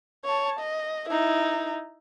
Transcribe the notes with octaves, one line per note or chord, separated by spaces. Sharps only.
C#5 A5
D#5
D#4 E4